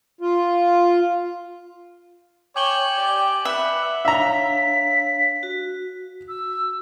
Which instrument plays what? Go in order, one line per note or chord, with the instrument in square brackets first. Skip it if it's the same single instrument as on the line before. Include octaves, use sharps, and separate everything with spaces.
[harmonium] F4
[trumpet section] C#5 [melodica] G5 G#5 [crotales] D6 F#7 G7
[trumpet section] G4 D5
[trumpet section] B4 [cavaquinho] E5 [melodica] F#5
[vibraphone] D4 C#5 F5 [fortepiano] E5 A#5 [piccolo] B6
[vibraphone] F#4
[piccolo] E6